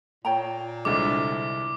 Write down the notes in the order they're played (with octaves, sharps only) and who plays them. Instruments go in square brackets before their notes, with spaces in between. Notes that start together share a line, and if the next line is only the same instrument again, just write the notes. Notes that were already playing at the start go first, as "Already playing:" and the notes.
[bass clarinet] A#2 [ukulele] C#5 G5 A#5
[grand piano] C2 D3 G#3 [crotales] D6